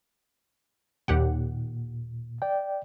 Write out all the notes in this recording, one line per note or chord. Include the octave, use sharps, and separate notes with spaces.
D#2 A#2 G4 F#5
D5 G5